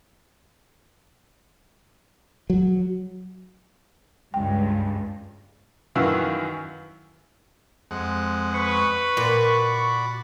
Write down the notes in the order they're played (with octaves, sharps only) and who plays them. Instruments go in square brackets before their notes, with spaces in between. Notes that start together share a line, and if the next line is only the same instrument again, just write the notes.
[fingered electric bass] F#3
[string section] C#2 G2 [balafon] G5
[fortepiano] F#2 D#3 E3 B4 F5 E6
[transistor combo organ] F2 G#3 F#5
[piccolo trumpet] B4 [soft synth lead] C#6
[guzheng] A#2 [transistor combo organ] F#4 D5 B5